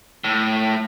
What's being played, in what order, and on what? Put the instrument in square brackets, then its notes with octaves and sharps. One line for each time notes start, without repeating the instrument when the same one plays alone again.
[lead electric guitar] A2